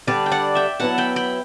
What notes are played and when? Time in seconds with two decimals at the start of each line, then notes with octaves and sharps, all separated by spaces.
0.07 D3 G3 D4 B4 D5
0.26 G5
0.32 D5 F#5
0.55 E5 G5
0.80 F#3 B3 E4 F#5 A5
0.98 G5 B5
1.16 G5 B5